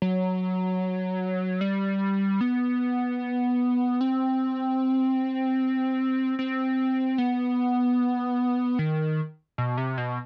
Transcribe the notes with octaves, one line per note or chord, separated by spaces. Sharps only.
F#3
G3
B3
C4
C4
B3
D#3
B2
C3
B2